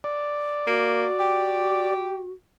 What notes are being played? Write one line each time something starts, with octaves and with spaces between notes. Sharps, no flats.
D5
A#3 F#4
G4